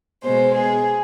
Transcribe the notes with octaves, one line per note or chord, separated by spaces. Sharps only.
B2 G#3 C5
G#4